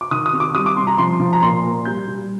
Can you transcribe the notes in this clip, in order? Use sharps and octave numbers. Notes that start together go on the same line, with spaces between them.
D6
D#3 D#6
D#6
C3
D6
G3 D#6
D6
C3 C6
A#5
F3 C6
F3
A#5
A#2 C6
A#2
G3 G6
G3